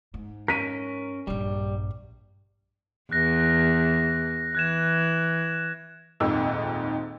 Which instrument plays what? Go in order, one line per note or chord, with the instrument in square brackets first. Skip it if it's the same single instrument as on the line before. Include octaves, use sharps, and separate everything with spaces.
[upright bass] G#2
[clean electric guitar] C#4 A#4 [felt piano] B6 D#7
[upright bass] A#1 G2 [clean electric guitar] G3
[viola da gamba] E2 [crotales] F#6 A#6
[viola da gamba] E3 [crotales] F#6 G#6 E7
[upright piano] D#1 F2 G#2 E6